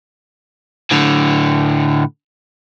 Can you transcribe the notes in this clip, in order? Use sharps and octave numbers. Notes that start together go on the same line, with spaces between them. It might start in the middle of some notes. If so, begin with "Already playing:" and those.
A2 D3